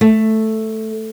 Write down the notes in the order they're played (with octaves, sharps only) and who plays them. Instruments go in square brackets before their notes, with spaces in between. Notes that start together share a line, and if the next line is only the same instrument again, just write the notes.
[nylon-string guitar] A3